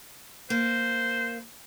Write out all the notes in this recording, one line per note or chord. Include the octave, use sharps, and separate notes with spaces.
A#3 C5